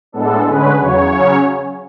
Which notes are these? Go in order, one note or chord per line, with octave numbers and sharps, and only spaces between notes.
A2 G#3 B3 D4 A4
D3 G#3 C#4 B4
E2 C#3 F#3 C#5
C#3 F#3 C#4